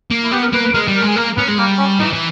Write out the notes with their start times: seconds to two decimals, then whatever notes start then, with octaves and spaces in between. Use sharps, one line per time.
0.11 A#3
0.24 E4
0.32 B3 G4
0.42 A#4
0.53 A#3 B4
0.64 B4
0.74 G#3 A#4
0.88 G3
0.96 A#4
1.02 G#3
1.07 G#4
1.16 A#3 A#4
1.36 B3 C#4
1.48 G#3
1.58 G3 A#3
1.79 C#4
1.99 E3 D#4
2.13 E3